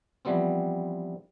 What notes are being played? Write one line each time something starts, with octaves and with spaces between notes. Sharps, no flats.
E3 F3 G3 B3 C4